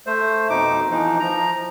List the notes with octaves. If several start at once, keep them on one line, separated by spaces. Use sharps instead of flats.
A3 C5
F2 B2 D#4 D6
E3 F3 D#4
F3 A#5